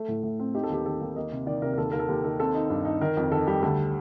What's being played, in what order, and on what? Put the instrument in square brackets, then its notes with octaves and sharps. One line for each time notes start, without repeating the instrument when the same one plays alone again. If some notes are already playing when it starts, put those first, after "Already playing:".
Already playing: [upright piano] A3 A4
A2
A2
C4
D#4 G4
A4
D#2 G4
D#3 A4
D#2
A#3 D#5
C3
D#3 D5
C3 A#4
A#4
D#2 A4
D#2 A#4
A4
D#2 G4
D#3 A4
C4 A4
D#4
G2
D#4
D#3 A#4
F2
D#3 A4
G3 G4
D2 A4